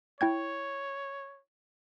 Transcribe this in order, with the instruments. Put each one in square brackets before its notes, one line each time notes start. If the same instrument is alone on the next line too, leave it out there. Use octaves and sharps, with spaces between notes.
[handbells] E4 G5 G#6 [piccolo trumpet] C#5